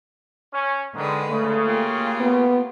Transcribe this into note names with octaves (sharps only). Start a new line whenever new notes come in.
C#4
G#2 D3 D#3 G#3 B4
C#3 A3
A#3 F4 G4
B3